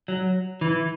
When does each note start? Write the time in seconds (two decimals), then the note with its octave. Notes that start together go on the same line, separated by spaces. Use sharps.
0.08 F#3
0.61 E3